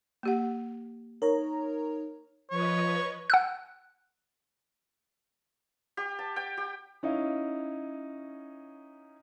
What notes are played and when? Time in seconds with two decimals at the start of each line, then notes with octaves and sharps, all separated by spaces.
0.23 A#3 G4 F#5
1.22 D#4 A#4 C#5 A#5
2.51 F3 B4 C#5 D#5
3.30 F#5 E6 F#6
5.97 G4
6.19 A5
6.36 G5
6.57 G4
7.03 C#4 D#4 E4 F5